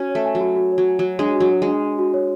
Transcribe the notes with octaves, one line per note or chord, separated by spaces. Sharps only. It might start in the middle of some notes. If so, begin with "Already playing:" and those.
Already playing: C#4 F#4
C#5
A3
G#5
F#3
F#4
F#4
C#5
F#3
G#5
F#3 F#4
G#3 D4
F#4
F#3
C#5
G#3
D4
D4
F#4
C#5